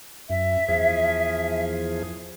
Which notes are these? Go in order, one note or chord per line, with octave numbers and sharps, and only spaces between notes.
F#2 E5
E2 F3 G#4